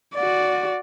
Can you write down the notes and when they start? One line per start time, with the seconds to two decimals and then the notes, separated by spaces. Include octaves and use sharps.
0.14 F#4 D5